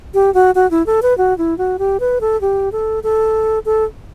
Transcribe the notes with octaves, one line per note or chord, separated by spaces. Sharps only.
G4
F#4
F#4
E4
A4
B4
F#4
E4
F#4
G4
B4
A4
G4
A4
A4
A4